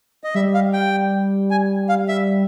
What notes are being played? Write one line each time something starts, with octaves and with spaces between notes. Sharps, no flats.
D#5
G3 E5
F5
G5
G#5
F5
E5